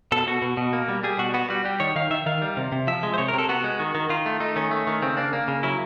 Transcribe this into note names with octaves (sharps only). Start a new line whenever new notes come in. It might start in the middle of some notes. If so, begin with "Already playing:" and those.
B2 A4
B2 F#4
B2
B2
A#3
G3
G3 G#4
B2 F#4
B3 F#4
G3 F#4
G3 G4
D#3 C#5
D#3 F5
D#3 E5
D#3 F5
G3
C3
C3
F3 E5
G#3
C5
C3 C#5
A#4
C3
A4
B3 F#4
G#3
D#3
D#3
D#3 F4
A3
A3 D#4
D#3 C#4
A3
D#3
C#3 C4
A#3 D4
A#3
C#3
F#3 E4